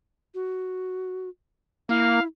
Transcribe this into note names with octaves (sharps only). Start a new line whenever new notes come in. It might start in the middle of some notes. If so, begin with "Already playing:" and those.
F#4
A#3 E4 F5